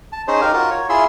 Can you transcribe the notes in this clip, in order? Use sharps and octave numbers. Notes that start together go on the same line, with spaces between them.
A5
C#4 D#4 G#4 C5
D#4 G4 A#4 F5
F4 F#4 A#4
C#5
E4 F4 G#4 E5 C6